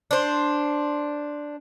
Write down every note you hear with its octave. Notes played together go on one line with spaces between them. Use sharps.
D4 C5